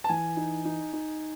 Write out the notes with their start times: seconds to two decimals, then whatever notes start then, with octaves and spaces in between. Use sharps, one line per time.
0.04 A5
0.09 E3 G#5
0.37 D#4
0.65 D#4
0.93 D#4